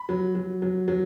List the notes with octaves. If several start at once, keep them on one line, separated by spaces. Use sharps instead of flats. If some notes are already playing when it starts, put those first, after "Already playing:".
Already playing: B5
F#3
F#3
F#3
F#3